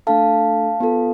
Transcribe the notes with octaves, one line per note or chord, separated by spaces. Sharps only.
A3 D4 A4 F5 A5
B3 F4 A4